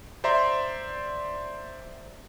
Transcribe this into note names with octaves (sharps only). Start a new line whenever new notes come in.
C5 D5 E5 A#5 C6